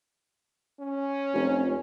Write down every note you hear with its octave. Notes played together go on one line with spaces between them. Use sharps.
C#4
F1